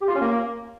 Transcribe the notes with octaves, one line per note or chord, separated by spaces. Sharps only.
G4
F4
C#4
A#3